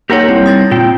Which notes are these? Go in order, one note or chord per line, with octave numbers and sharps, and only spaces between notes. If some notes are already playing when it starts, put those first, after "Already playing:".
A#3 D#4 G4 A#4 C#5 F#5
G3 C4 E4
D#6 A6 A#6
A#2 C4 F4 G5